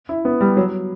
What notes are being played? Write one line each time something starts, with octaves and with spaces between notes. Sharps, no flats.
E4
B3
G3
F#3